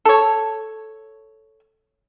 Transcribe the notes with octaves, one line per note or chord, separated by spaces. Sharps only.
A4 C#5